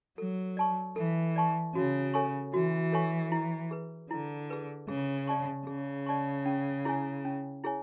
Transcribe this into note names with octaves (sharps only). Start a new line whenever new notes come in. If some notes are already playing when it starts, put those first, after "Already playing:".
F#3 A4
D5 A5 C#6
E3 A4
D5 A5 C#6
C#3 F#4
A4 C#5 G#5 C#6
E3 F#4
A4 C#5 G#5 C#6
E4
G#4 B4
D3 E4
G#4 B4
C#3 G#4
D5 A5 C#6
C#3 G#4
D5 A5 C#6
C#4
E4 G#4 C#5 G#5
C#4
E4 G#4 C#5 G#5